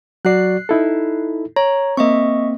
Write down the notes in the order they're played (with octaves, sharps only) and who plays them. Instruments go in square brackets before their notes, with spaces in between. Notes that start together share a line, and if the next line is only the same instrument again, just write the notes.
[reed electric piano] F#3 F#4 D5 [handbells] F#6 C7
[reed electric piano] D#4 E4 A4
[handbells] C#5 [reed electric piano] A#5
[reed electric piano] A#3 C4 [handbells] D#5 E5 C#6